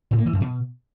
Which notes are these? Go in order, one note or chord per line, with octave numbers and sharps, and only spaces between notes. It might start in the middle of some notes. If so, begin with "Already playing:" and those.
A2
A#3
E3
F#2
B2